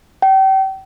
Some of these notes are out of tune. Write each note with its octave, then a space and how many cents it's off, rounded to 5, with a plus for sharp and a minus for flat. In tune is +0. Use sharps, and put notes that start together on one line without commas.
G5 -35